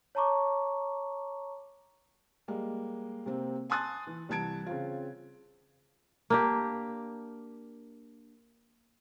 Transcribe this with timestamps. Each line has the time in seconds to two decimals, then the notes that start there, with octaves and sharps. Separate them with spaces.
0.15 C#5 A5 A#5 C#6 D6
2.48 G3 G#3 A#3
3.26 C3 A#3 C4
3.70 G#5 A5 C6 D#6 F#6 A6
4.07 E3
4.29 C2 E3 A5 G#6 D7
4.66 C#3 C4 F4
6.30 A#3 D4 G4